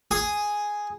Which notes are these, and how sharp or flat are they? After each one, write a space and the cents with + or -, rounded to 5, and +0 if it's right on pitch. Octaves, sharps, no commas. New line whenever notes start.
G#4 +0 D#6 +0